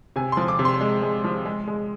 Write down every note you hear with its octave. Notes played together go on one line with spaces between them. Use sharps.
C3 G#5
F3 C6
D6
C3
C6
G#3
G#3
F3
G#3
G#3